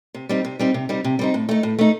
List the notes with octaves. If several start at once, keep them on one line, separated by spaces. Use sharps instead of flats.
C3
G3 C4 D#4
C3
G3 C4 D#4
C3
G3 C4 D#4
C3
G3 C4 D#4
A2
A3 D#4
A2
A3 D#4